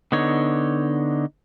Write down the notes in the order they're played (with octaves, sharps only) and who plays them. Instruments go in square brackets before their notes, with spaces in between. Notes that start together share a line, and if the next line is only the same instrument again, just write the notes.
[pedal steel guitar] D3 B3 D#4 C#5